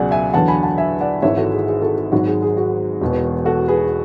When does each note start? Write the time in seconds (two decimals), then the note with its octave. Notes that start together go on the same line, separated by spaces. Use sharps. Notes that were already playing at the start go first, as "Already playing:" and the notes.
Already playing: C#2 B2 F#3 G#4 D5 F#5 G#5
0.11 E5 G#5
0.34 E2 D3 F#3 F#5 A5
0.48 G#5 B5
0.63 F#5 A5
0.78 E5 G#5
1.01 D5 F#5
1.22 G#1 G#2 E3 C#5 E5
1.37 F#4 A4
1.52 G#4
1.68 G#4
1.82 F#4 A4
1.97 G#4
2.12 G#1 G#2 F#3 F#4
2.27 G#4
2.42 G#4
2.57 F#4
3.01 E1 E2 B2
3.45 F#4 A4
3.68 G#4 B4